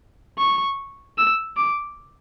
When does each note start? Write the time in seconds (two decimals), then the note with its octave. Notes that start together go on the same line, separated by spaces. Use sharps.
0.38 C#6
1.18 E6
1.57 D6